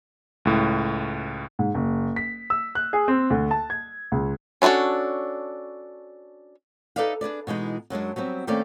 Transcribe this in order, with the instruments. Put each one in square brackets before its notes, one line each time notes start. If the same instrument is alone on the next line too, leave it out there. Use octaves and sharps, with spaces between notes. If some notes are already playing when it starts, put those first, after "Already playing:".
[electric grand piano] C#2 A2
[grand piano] G#2
F#1
B6
E6
F#6
G#4
C4
D2
A5
G#6
C#2
[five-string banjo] C#4 D4 F4 F#4 A4
[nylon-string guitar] D#4 A4 B4 D5 E5 F5
D4 G#4 B4 D5
B2 E3 G#3 D#4
F#2 F#3 G#3 D4
F#3 G3 B3 C4
D#3 A3 A#3 C4 C#4 D5